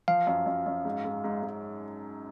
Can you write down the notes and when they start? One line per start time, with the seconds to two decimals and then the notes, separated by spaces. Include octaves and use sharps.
0.08 F3 F5
0.27 F#2
0.46 F#2
0.66 F#2
0.85 G#2
1.05 G#2
1.24 G#2
1.43 G#2